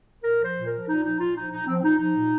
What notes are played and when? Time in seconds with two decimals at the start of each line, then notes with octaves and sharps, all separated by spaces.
0.23 A#2 A#4
0.39 F3
0.44 C5
0.55 A#2
0.66 A#4
0.71 F3
0.87 A#2 D#4
1.03 F3 D#4
1.19 A#2 F4
1.35 F3 D#4
1.51 A#2 D#4
1.66 F3 C4
1.79 C4
1.83 A#2 D#4
1.98 F3 D#4
2.15 A#2